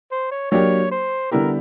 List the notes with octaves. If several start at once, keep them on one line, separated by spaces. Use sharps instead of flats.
C5
C#5
F#3 A#3 D4 G4 C#5
C5
D3 G3 B3 E4 G4 A#4